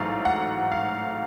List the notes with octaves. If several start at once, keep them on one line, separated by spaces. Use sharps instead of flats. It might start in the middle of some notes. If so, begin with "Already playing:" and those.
Already playing: A1 G#2 F#3 A3 F5
F#5
F5